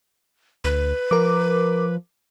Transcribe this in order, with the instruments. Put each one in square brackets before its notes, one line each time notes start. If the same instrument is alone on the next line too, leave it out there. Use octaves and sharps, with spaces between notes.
[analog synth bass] D2 [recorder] B4
[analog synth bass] F3 [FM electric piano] A#4 D6